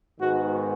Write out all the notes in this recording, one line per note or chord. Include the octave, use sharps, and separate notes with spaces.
G#2 D#3 G#3 B3 F#4